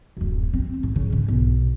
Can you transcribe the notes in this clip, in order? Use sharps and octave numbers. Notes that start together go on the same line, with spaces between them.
D1 F#2
C4
G#2
C#3
G#2
B1